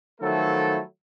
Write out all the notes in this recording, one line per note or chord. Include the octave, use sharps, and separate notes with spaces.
D#3 F3 F#3 A3 E4 A4